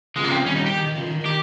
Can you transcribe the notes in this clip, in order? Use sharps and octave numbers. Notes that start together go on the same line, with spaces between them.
C#3 F3 G#3
A#3
C4
D#3 G3 C#4
D#4
G4
D#3
D#3
C#3 F3
D#3
D#3 G4